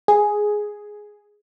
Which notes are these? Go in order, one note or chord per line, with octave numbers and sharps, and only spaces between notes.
G#4